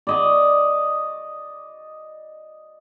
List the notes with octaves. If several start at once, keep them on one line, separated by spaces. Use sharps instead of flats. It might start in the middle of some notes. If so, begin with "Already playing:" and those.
D5 D#5 C#6